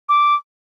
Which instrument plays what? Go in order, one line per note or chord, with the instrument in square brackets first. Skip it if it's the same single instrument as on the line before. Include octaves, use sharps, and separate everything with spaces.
[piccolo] D6